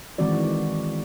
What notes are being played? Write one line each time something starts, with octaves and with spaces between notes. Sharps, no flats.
D#3 E3 G#3 C4 F#4 D5